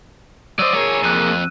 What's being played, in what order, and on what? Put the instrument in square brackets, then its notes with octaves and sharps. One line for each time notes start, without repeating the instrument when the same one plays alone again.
[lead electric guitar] F#3 C5 [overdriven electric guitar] D5 D#5 [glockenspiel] E6 D#7
[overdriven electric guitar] A#3 G#4 [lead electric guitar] C#5
[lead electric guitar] F2 [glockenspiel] F#6 D#7